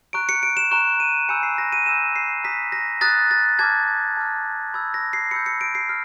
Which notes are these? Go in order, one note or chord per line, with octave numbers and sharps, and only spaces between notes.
A#5 C#6 F#6 D7
C#7
D7
E7
A#5 C#6 F#6 E7
D#7
G#5 B5 E6 G6 C#7
C7
A#6
D#7
G#5 B5 E6 G6 E7
C7
A#5 D#6 F#6 B6
A#6
A#5 D#6 F#6 A6
A6
A5 D6 F6 G#6
A5 D6 F6
B5 E6 G6 G#6
A#6
C7
B5 E6 G6 C#7
C#7
D7
C7
F6